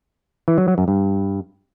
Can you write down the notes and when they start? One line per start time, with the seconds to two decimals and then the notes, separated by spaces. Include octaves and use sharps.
0.48 E3
0.58 F#3
0.68 F#3
0.78 F#2
0.88 G2